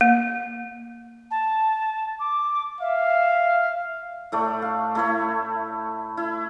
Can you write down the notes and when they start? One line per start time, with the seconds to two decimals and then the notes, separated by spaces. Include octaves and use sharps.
0.01 A#3
1.31 A5
2.20 D6
2.80 E5 F5
4.32 A2 A3 D5
4.62 F5
4.95 A3 E4 C#5
6.17 E4